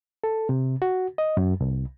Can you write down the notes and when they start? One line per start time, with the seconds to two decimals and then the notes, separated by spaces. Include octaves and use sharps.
0.24 A4
0.49 C3
0.82 F#4
1.18 D#5
1.37 F#2
1.61 C2